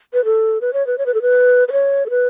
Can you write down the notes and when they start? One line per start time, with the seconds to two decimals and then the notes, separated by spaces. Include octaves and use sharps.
0.13 B4
0.25 A4
0.61 B4
0.73 C#5
0.87 B4
0.98 C#5
1.06 B4
1.14 A4
1.22 B4
1.68 B4
1.72 C#5
2.06 A4
2.10 B4